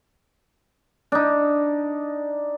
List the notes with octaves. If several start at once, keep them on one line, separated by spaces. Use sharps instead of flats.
D4 D#4